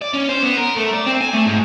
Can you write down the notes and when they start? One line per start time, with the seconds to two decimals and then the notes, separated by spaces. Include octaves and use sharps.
0.02 D5
0.14 C#4
0.29 C5
0.43 B3
0.57 A#4
0.77 A3
0.94 D5
1.07 C4
1.21 G#5
1.33 A3
1.46 G#2